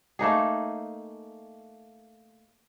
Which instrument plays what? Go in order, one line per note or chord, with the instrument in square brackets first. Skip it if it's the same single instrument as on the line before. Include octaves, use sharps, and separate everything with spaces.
[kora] A3 A#3 D#4 G#4